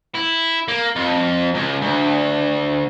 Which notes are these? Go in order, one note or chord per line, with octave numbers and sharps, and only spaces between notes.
E4
A#3
F2
C#2
D2